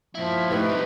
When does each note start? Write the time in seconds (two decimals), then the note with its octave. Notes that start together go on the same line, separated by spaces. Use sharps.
0.15 A#2 F3 E4
0.51 A2 D#4 E4 G4 B4
0.69 G3 C4